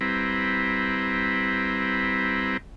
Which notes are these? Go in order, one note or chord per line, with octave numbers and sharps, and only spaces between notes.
G3 C4 E4 B4 A#5